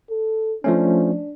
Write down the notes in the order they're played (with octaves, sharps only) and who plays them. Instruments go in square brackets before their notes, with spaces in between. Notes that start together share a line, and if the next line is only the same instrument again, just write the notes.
[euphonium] A4
[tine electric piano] F3 A3 C#4 [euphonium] D4